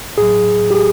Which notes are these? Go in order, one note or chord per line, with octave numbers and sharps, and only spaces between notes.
A2 F#3 G#4
G4
G#4